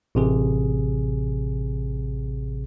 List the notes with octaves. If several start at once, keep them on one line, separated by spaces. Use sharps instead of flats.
A1 C3 G#4